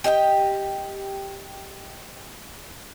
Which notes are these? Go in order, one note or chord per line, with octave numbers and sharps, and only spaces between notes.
G4 D#5 E5 G5